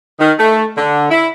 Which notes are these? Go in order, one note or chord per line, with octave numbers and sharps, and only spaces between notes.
D#3
A3
D3
E4